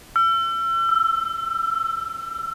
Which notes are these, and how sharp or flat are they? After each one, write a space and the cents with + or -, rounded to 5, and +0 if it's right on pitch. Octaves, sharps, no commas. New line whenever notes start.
E6 +40
E6 +10